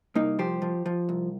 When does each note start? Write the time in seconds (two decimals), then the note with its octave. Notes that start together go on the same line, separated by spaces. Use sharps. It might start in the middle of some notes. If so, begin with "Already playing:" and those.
0.15 C2 A#3 D#4
0.39 F3 G4 C5
0.62 F3
0.86 F3
1.09 C2